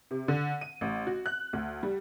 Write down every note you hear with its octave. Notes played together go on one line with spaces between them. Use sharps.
C3
D3
D#7
A1
F#4
F#6
D2
G3